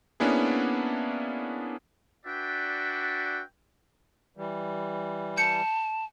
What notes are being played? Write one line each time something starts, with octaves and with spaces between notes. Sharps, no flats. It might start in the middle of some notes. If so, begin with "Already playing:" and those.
A#3 B3 C#4 D4 E4 G#4
D4 F#4 B4 D5 E5 G5
E3 G3
A5 G6 C#7